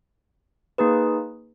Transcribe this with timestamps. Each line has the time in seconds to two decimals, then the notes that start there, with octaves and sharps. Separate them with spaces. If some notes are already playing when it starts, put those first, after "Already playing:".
0.78 A#3 D#4 G#4 B4